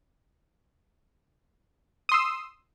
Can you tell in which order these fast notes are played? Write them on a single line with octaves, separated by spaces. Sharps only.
D#6 C6 E6